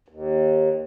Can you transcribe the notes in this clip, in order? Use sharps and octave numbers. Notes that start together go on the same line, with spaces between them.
D#2